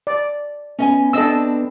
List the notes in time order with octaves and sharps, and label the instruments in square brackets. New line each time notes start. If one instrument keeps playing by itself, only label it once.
[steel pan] D5
[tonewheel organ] B3 [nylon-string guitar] C#4 D#5 G#5
[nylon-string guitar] C4 D4 [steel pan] A4 D#5 E6